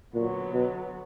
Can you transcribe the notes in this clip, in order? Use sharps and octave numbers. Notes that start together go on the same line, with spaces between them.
A#2 D3 F#3 B3
B2